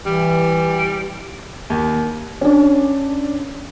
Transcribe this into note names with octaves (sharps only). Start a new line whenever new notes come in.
E3 G3
D#2
C#4 D4